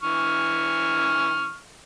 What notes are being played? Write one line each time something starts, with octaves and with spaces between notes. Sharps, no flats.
E3 C#6 F6